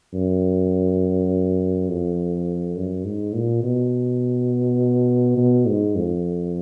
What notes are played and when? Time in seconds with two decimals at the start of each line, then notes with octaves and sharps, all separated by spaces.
0.14 F#2
1.89 F2
2.75 F#2
3.05 G#2
3.34 A#2
3.63 B2
5.37 B2
5.67 G#2
5.96 F2